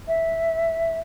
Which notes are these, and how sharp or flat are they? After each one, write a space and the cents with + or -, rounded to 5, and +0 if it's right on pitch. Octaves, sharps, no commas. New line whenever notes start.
E5 -5